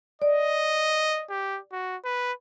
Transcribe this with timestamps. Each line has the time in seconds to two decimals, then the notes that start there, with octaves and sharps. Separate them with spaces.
0.22 D5 D#5
1.30 G4
1.72 F#4
2.05 B4